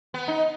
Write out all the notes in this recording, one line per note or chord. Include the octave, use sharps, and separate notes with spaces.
B3
D#4